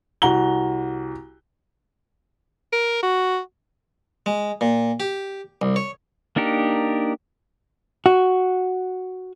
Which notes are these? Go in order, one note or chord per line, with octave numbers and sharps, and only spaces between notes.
C2 F#4 A#5 G7
A#4
F#4
G#3
A#2
G4
C2
C#5
A#3 D4 D#4 G4 A#4
F#4